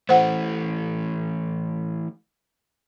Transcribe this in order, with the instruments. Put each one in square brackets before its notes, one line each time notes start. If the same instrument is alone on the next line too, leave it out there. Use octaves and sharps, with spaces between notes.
[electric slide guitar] E3 A3 [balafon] C5 F#5